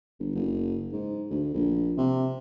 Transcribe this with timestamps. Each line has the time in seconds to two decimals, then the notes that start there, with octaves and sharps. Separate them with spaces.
0.20 G1
0.35 F#1
0.93 G#2
1.30 D2
1.54 A#1
1.97 C3